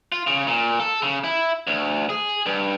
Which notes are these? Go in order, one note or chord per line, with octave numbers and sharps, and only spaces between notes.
F4
C#3
A#2
A4
C#3
E4
D2
G#4
G2